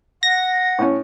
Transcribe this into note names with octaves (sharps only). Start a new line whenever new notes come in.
F#5 A#6
A2 C#4